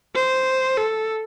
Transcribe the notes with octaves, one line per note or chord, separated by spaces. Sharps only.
C5
A4